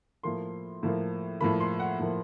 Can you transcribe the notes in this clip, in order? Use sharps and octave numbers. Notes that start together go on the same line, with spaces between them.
A2 F3 A#3 C6
A2 F3 A#3
A2 F3 A#3 B5
C6
F#5
A2 F3 A#3